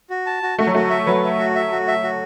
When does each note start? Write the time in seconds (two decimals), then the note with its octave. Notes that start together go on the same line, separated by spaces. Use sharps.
0.10 F#4
0.26 A5
0.43 F#4
0.58 A3 F#4
0.67 F#3
0.74 A3 F#4
0.90 E5
1.07 F#3 B4
1.23 E5
1.39 F#4
1.56 E5
1.72 F#4
1.87 E5
2.03 F#4